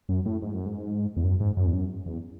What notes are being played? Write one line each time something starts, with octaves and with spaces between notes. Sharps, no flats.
F#2
A2
G#2
F#2
G#2
E2
F#2
G#2
F#2
E2
F#2
E2